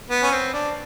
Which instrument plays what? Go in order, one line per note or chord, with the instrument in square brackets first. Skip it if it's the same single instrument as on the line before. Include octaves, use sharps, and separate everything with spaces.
[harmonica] B3
C#4
C4
D4